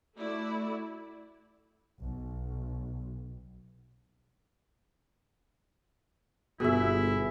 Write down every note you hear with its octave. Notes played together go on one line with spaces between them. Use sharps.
A3 E4 F#4 D5
B1
G1 B2 E4 G#4 E5